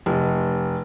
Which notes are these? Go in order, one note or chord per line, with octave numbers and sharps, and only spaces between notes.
F1